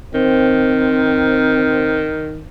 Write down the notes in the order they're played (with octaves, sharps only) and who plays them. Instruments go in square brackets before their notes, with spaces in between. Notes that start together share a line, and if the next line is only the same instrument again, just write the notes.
[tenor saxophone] D#3 [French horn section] C4